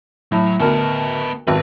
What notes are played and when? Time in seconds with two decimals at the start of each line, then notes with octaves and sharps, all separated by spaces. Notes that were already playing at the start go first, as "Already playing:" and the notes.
0.32 A2 F#3
0.60 D2 B2 B3 A#4 A5
1.48 G#1 B4